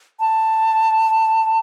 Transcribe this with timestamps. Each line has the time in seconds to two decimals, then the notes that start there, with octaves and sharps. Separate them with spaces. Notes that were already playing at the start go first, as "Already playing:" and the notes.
0.20 A5